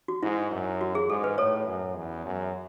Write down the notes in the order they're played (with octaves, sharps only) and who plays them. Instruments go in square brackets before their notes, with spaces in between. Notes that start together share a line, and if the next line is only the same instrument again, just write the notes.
[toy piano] F#4
[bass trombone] G#2 [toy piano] E4
[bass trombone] F#2
[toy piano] F#4
G#4
[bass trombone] G#2 [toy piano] A4
[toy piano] B4
[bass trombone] A2 [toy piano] A4 C#5
[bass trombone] F#2
E2
F#2